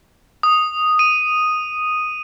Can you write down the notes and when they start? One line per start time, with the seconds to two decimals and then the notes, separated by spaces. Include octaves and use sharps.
0.43 D#6
0.99 D#7